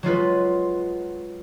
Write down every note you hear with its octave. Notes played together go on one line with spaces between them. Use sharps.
F#3 G#3 F4 B4